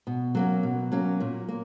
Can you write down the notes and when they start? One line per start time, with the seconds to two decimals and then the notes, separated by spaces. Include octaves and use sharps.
0.07 B2
0.35 F#3 A#3 C#4
0.63 B2
0.92 F#3 A#3 C#4
1.20 A#2
1.49 A#3